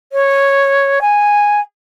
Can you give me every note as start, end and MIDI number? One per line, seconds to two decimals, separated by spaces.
0.13 0.99 73
1.01 1.60 80